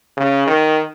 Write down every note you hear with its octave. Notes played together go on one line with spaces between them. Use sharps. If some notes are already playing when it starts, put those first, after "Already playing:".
C#3
D#3